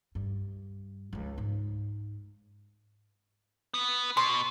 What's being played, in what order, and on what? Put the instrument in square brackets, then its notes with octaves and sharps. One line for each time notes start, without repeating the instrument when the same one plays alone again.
[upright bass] G2
C#2 F3
G#2
[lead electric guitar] B3
[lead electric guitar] B2 [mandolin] C6